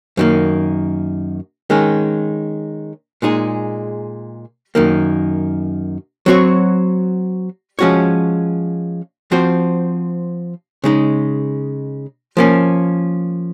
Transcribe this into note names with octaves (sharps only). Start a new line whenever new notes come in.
F#2 D#3 A#3
D#3 G#3 C#4
A#2 G#3 D#4 G#4
F#2 D#3 A#3
F#3 C4 F#4 C#5
F3 G#3 C#4 F#4 C#5
F3 C4 F#4 C5
C#3 G#3 D#4
F3 A#3 C#4